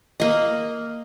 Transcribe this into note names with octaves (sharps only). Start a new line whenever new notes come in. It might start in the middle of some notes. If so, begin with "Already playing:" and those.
A#3 D#5